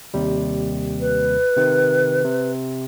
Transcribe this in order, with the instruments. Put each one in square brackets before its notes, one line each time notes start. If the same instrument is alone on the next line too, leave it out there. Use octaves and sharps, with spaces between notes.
[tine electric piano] D#2 C3 G3
[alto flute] B4
[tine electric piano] C3 D#3
C3